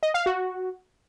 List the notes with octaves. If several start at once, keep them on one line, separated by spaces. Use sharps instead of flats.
D#5
F5
F#4